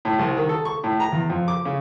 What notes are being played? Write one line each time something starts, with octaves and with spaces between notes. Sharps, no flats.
A2
C2
D#3
A4
C#6
A2
A#5
E2
F2
D6
C#3